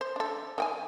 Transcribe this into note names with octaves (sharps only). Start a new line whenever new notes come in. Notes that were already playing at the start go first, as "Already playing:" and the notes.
C5
D4 A4
D#3 G5 G#5